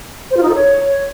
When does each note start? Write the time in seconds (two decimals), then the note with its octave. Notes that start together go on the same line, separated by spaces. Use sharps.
0.31 C5
0.37 F4
0.43 D#4
0.49 A4
0.55 C#5